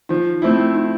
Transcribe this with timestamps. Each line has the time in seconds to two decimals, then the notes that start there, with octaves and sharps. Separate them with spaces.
0.09 F3 D#4
0.42 A3 C4 E4
0.75 D#4